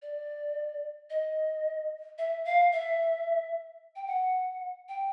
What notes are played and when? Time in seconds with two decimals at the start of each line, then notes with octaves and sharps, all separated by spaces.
0.02 D5
1.10 D#5
2.18 E5
2.45 F5
2.72 E5
3.96 G5
4.07 F#5
4.89 G5